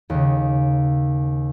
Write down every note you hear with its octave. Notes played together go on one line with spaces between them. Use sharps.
D#2 C#3